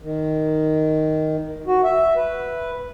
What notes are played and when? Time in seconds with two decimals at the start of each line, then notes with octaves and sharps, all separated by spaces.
0.01 D#3
1.67 F#4
1.84 E5
2.16 B4